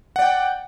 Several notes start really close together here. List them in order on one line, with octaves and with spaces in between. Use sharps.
F#5 D5 G5